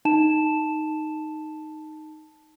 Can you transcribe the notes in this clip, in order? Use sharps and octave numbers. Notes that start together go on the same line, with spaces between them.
D#4 A5 E7